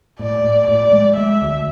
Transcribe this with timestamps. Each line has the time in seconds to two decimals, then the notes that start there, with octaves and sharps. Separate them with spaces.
0.19 A2 D5
0.44 A2
0.68 A2 D5
0.92 G#3
1.16 G#3 E5
1.42 D2